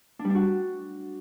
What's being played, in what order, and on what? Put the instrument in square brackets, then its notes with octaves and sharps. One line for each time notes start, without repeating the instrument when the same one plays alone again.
[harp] D4
G3
D4
F#4